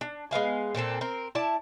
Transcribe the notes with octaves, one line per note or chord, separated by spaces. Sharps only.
D4
G#3 B3 F5 G#5
A#2 D3 C4 A4
C4 A#4
E4 D5 A5